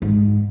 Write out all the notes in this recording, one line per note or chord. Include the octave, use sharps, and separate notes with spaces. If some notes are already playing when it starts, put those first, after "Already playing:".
G#2